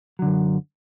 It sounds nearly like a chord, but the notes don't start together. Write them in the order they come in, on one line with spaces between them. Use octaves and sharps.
F#3 D3 F#2